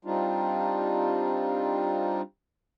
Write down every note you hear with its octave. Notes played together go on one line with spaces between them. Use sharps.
G3 C4 D4 D#4 F4